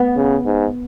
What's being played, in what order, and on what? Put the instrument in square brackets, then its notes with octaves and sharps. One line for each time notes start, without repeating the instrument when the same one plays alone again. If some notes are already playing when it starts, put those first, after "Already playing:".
Already playing: [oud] B3
[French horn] C#3
G#2